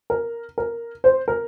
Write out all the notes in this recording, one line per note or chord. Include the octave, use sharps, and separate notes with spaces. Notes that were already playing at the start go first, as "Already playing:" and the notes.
A#4
A#4
C5
A#4